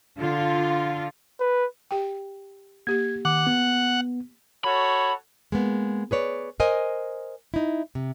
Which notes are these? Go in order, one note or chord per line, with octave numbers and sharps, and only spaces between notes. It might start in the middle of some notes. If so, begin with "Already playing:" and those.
D3 F4
B4
G4 G5
A#3 G4 G#6
D#3 F#5 D6
B3
F#4 A4 C#5 B5
G#3 A#3 B3
G#4 B4 C#5 D5
A#4 C5 D#5 G#5
D#4 E4
C3